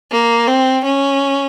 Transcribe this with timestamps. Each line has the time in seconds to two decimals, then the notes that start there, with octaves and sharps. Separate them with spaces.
0.11 A#3
0.47 C4
0.85 C#4